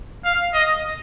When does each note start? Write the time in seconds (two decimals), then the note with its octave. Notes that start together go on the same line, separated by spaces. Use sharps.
0.25 F5
0.54 D#5